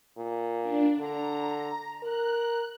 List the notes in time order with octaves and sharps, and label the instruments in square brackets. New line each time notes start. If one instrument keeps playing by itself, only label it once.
[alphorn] A#2
[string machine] D4
[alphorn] D3 [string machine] A#5
[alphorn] A#4 [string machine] F#6